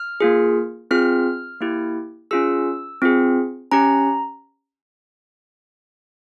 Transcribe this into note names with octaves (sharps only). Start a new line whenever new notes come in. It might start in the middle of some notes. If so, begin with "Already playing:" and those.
Already playing: F6
A#3 F4 G#4
C4 F4 G#4 F6
A#3 E4 G4
C#4 F4 G#4 E6
C4 F4 G#4
C#4 G4 A#5